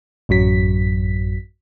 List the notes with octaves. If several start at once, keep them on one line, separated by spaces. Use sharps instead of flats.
A1 F#2 F#3 B6